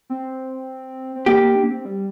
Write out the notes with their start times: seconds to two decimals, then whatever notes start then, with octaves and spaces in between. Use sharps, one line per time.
0.10 C4
1.16 C4
1.26 A#3 G4
1.42 A#3
1.55 D4
1.63 A#3
1.71 C4
1.85 G3